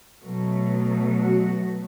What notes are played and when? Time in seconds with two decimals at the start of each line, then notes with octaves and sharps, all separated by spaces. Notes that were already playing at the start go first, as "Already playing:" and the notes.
0.22 B2 F#3 A3
1.14 F#4